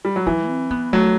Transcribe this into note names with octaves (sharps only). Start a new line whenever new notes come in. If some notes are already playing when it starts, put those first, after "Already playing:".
G3
F#3
E3 F#3
C4
B3
F#3 A3